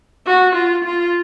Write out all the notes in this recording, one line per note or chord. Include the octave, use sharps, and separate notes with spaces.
F#4
F4
F4